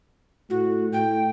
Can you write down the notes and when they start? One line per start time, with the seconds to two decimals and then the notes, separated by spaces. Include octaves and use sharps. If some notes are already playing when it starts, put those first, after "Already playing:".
0.50 A2 F#4
0.93 A2 G5